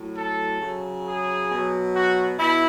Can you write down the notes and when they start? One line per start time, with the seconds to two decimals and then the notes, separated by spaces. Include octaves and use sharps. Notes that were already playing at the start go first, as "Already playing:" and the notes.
Already playing: A2 F#3
0.16 A4
0.62 C#3 F#3
1.06 G#4
1.50 B2 F#3
1.95 F#4
2.39 B2 E4